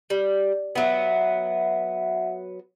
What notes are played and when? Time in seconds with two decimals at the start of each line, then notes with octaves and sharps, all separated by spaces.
0.10 G3
0.75 F#3 B3 E5 F#5